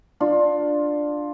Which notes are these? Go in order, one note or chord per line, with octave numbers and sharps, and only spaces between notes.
D4 F4